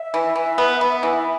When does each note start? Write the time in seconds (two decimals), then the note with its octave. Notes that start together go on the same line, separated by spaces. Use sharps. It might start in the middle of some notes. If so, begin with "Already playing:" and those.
Already playing: E5
0.14 E3
0.36 E3
0.58 B3
0.81 B3
1.03 E3